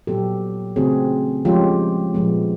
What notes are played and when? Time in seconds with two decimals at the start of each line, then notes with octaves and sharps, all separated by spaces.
0.07 A#2 F#3 B3 G4 A4
0.76 C#3 E3 A3 C4 F#4 G#4
1.45 F3 G#3 C#4 F4 G4
2.14 A#2 F3 G#3 B3